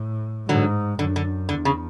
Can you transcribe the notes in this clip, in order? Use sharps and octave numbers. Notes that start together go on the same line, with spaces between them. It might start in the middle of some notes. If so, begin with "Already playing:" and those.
Already playing: A2
G#2 D3 F#3
F#2 D3
D3
E2 D3
C#3